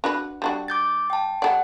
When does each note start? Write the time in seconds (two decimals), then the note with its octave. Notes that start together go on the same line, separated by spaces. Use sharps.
0.04 D4 F#4 B4
0.42 G3 D4 F#4
0.68 D6 G6 A6
1.10 G5 A5
1.42 G3 A4 D5 F#5